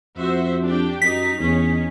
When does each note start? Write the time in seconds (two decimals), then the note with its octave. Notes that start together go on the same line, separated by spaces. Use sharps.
0.17 F2 F#4 C5 E5
0.62 D4 G4 G5
1.02 F#2 D#4 B6
1.40 E2 C#4 D#4